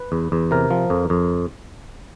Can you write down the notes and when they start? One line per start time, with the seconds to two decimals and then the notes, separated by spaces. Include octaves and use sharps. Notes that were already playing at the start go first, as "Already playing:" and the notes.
Already playing: B4
0.12 E2
0.32 E2
0.51 C3 A#4
0.71 F3
0.90 F2
1.10 F2